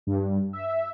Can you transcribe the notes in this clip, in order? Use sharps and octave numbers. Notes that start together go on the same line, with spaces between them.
G2
E5